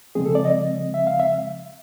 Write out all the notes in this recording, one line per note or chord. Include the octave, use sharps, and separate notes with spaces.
C#3 F3 G#3 C4 G#4
A4
D5
D#5
E5
F5
E5